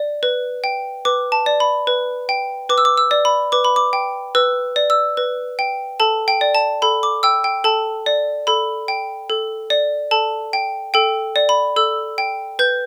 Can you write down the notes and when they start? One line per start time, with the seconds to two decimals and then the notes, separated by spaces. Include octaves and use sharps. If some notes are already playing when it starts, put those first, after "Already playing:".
Already playing: D5
0.23 B4
0.64 G5
1.05 B4 D6
1.32 A5
1.46 D5
1.60 B5
1.87 B4
2.29 G5
2.70 B4 D6
2.78 E6
2.85 D6
2.98 E6
3.11 D5
3.25 B5
3.52 B4 D6
3.65 B5
3.76 D6
3.93 G5
4.35 B4 E6
4.76 D5
4.90 E6
5.17 B4
5.59 G5
6.00 A4 A5
6.28 G5
6.41 D5
6.55 A5
6.82 A4 B5
7.03 D6
7.23 G5 E6
7.44 G5
7.64 A4 A5
8.06 D5
8.47 A4 B5
8.88 G5
9.30 A4
9.70 D5
10.11 A4 A5
10.53 G5
10.94 A4 G5
11.36 D5
11.49 B5
11.76 A4 E6
12.18 G5
12.59 B4 G6